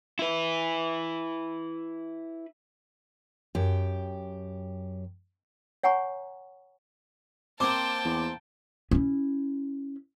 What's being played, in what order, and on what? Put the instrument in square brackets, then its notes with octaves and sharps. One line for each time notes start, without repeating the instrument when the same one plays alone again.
[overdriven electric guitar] E4 B4
[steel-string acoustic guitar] F#2 G4
[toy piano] C#5 F#5 G#5 A#5 C#6
[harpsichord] A#3 C4 [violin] G5 A5 [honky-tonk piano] D6
[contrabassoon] E2
[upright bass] C#4 E4